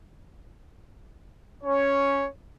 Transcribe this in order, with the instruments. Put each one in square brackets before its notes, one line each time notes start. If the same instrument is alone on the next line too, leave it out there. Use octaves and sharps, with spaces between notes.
[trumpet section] C#4 C#5